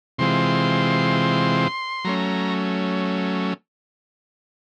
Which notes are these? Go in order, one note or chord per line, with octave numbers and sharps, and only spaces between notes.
C3 E3 G#3 C4 F4 C6
F#3 A3 C#4 A#5